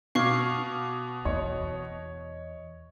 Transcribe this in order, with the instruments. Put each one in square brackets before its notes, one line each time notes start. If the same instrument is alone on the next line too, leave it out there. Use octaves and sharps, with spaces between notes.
[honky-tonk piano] B2 [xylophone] F5 C#6 [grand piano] D6 F6 G#6
[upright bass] E2 [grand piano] C#5 D#5